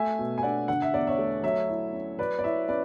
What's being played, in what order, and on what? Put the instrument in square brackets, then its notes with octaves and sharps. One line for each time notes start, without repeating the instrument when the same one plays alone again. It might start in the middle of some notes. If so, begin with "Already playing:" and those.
Already playing: [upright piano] A3 E5 G#5
B2
G#5
D4 D5 F#5
D3 F#5
E5
E2 D5
C#5 E5
A3
F#3 C#5 E5
E4
C#4
F#3 B4 D5
D5
E4 C#5 E5
C#4 B4 D5